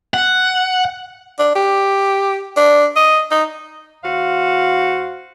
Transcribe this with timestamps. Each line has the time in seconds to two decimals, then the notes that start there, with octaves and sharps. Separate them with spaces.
0.14 F#5
1.39 D4
1.55 G4
2.57 D4
2.96 D#5
3.31 D#4
4.04 E2 F#4 C5 F5